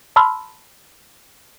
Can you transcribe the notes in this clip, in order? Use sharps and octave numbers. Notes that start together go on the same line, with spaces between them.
A5 B5 C6 E6 F6